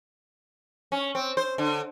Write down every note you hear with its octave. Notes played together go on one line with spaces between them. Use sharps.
C#4
C4
C5
D3